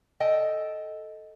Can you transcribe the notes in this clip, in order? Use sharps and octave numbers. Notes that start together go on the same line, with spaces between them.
A4 D#5 G5